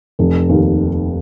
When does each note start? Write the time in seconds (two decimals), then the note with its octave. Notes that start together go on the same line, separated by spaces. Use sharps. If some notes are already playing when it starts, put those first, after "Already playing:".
0.19 F1
0.49 D#2